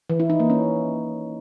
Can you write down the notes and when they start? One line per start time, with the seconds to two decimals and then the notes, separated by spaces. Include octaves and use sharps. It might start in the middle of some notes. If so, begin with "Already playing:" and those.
0.10 E3
0.20 E4
0.30 D#4
0.40 A#3
0.50 C#4